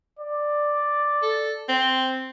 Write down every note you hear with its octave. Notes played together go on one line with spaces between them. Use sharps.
D5
A4
C4